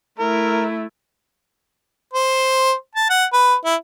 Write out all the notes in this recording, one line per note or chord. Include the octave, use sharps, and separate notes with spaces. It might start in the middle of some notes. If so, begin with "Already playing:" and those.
A3 E4 A#4
C5
A5
F#5
B4
E4